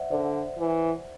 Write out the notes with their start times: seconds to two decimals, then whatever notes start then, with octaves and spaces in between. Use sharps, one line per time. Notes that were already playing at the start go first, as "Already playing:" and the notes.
Already playing: C5 D5 E5 F#5
0.11 D3 C5 D5
0.59 E3